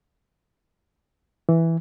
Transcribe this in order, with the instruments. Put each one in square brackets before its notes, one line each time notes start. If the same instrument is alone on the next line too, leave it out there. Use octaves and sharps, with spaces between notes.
[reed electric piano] E3